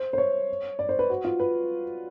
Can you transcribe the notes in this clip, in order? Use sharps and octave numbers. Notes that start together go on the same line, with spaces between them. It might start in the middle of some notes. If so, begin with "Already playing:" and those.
Already playing: C5
C5
C#5
D5
C5
B4
F#4
F4
B4